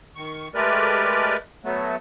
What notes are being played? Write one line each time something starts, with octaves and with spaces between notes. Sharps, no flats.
D#3 C#6
G#3 A3 G4 A#4 B4 D5
F#3 A3 B3